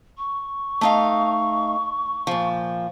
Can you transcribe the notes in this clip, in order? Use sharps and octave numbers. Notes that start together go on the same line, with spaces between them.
C#6
A3 D#4 F5
A#2 F3